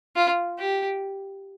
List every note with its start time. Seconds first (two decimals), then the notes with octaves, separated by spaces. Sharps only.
0.16 F4
0.59 G4